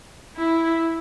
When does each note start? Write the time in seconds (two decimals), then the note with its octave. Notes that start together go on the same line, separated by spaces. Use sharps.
0.37 E4